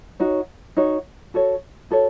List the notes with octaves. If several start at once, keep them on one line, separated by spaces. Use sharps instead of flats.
D#4 F#4 C#5
D#4 F#4 C#5
F#4 A4 C#5
F#4 A4 C#5